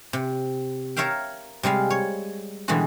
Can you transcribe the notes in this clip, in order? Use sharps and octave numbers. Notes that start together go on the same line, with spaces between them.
C3
A#4 C#5 E5 F5 G5
C3 G3 G#3 F5
C#5
B2 D3 E3 G3 G#3 F#4